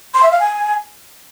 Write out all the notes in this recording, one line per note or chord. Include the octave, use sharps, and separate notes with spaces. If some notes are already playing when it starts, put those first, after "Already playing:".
C6
E5
F5
G#5